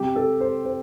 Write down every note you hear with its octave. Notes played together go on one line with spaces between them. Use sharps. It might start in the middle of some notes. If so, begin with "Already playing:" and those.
Already playing: C3 G3 G4
A4
C5
C5